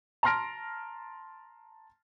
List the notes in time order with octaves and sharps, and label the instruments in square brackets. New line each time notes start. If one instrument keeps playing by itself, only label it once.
[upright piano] A5 A#5 C6 F6 A#6 D7